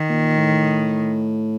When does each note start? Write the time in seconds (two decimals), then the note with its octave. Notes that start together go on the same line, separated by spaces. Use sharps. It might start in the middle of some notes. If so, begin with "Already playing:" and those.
Already playing: D#3
0.09 A#2
0.38 A2